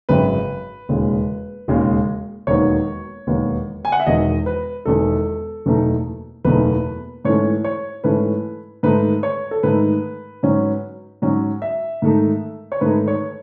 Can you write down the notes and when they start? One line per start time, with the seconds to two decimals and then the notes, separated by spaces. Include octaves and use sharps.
0.09 G#1 F#2 C#3 B4
0.89 E1 D#2 C#3 G#3
1.68 E1 D#2 C#3 G#3
2.47 E1 D#2 D#3 F#3 B3 C#5
3.27 E1 D#2 D#3 F#3 B3
3.85 G#5
3.92 F#5
4.00 E5
4.07 E1 E2 D#3 D#5
4.46 B4
4.85 E1 E2 D#3 A4
5.66 F#1 E2 B2 A3 D#4
6.45 F#1 E2 B2 A3 D#4 B4
7.25 G#2 E3 A3 C#4 C#5
7.64 C#5
8.04 G#2 E3 A3 C#4 B4
8.83 G#2 D#3 A3 D#4 B4
9.23 C#5
9.51 A4
9.63 G#2 D#3 A3 D#4 B4
10.43 G#2 F#3 C#4
11.22 G#2 F#3 C#4
11.62 E5
12.02 G#2 D#3 A3 D#4
12.72 C#5
12.81 G#2 D#3 A3 D#4 B4
13.08 C#5